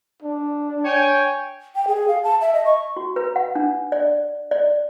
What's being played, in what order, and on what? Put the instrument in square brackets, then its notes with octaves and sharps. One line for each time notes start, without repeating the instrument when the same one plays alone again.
[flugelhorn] D4
[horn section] C#5 G5 G#5
[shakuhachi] G5
G#4
F5
A5
E5
D#5
C#6
[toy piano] F#4
B4
F#5
D4
D5
D5